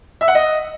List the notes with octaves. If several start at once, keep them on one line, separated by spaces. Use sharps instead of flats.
E5
F#5
D#5